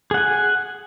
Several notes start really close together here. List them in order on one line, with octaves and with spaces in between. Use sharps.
G#4 F#5 G#5